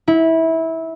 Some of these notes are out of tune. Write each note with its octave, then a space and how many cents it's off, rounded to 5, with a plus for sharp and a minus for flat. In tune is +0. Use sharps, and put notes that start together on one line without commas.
E4 -20